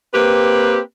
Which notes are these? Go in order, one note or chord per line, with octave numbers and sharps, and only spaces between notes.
A#3 C4 G4 B4